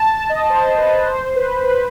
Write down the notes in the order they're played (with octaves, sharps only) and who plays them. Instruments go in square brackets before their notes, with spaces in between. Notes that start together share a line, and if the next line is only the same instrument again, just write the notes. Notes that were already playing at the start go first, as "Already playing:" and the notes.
Already playing: [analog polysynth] A5
A5
D#5
C5
B4
C5
B4
B4